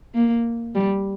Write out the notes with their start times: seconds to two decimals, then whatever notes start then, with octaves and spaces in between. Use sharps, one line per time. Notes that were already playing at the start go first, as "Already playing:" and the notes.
0.15 A#3
0.75 G3